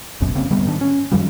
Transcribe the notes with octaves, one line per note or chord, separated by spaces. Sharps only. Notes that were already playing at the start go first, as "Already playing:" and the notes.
F#1 C2 F#2 B2
C#3 A#3 C4
D2 A2 G3 B3
G#2 D#3 D4
C#4
F#2 D#3 F3 G3